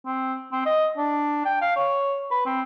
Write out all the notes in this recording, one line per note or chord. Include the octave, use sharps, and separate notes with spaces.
C4
C4
D#5
D4
G5
F5
C#5
B4
C4